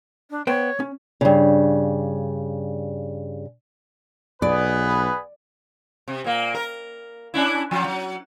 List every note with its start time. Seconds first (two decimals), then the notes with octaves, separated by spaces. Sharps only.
0.30 D4
0.47 B3 C5 C#5 G5
0.80 C#4
1.21 G2 C#3
4.42 B1 B3 G#4 B4 D5
6.08 C3
6.24 A#2 A#3
6.54 A#4
7.34 C#4 D4 E4
7.71 F3 F#3
7.84 F#3